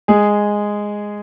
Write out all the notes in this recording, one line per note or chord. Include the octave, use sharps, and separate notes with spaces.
G#3 G#4